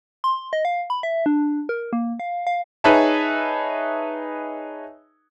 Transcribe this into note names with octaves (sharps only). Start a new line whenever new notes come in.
C6
D#5
F5
B5
E5
D4
A#4
A#3
F5
F5
D#4 G#4 B4 C#5 E5 A5